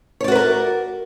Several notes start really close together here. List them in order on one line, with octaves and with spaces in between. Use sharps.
C#5 D5 F#4 B4 A#4